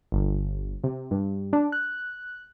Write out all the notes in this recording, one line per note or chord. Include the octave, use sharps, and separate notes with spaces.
G1
C3
G2
D4
F#6